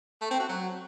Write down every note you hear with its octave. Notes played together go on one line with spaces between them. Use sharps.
A3
C4
F#4
F#3